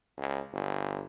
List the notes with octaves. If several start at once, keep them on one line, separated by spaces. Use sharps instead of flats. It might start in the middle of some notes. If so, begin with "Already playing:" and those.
C#2
G1